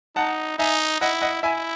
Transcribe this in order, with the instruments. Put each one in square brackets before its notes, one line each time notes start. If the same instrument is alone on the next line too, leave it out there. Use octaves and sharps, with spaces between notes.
[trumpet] D#4 [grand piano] F#5 A5
[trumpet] D#4 [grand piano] E5 G#5
[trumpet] E4 [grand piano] D#5 F#5
[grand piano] D#5 F#5
[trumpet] E4 [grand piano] E5 G#5